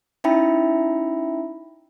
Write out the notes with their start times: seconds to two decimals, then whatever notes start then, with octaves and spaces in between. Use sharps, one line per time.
0.24 C#4 D#4 E4 E5 G5 B5